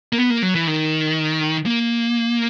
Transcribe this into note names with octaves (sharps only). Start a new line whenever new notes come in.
A#3
B3
A#3
F#3
E3
D#3
A#3